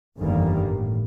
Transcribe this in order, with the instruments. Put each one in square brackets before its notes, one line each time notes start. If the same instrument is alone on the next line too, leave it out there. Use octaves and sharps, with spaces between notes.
[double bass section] G1 F2 D#3 E3 G3 A#3
A2